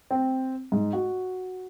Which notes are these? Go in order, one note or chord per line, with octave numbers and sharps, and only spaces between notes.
C4
G#2
F#4